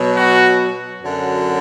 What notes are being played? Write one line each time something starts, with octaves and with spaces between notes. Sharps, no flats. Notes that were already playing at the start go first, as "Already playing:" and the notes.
Already playing: B2 F#3
F#4
F#2 D3 F#3